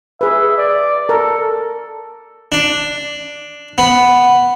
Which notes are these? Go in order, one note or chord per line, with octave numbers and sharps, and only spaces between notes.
G#4 B4 E5
D5
A4 A#4
D4
B3